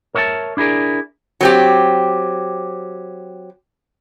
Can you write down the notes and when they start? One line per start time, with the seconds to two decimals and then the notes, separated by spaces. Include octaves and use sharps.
0.15 A#4 C#5 E5 G5 A5
0.57 D4 E4 G#4 A#4 D5
1.41 F#3 C4 G4